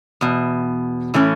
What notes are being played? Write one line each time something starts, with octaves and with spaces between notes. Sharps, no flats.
E2 B2
A2 E3 A3 C#4